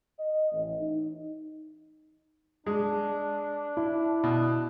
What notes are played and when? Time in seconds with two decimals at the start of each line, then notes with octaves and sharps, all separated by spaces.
0.20 D#5
0.52 A1
0.81 D#4
2.66 G#3 D4
3.77 E4
4.23 B2